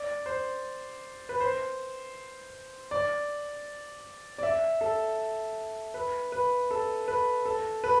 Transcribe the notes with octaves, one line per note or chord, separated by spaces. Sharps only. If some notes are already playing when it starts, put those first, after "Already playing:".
Already playing: D5
C5
B4
C5
D5
D5
E5
A4
B4
B4
A4
B4
A4
B4